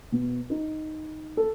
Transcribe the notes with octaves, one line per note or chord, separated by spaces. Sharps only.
B2
D#4
A4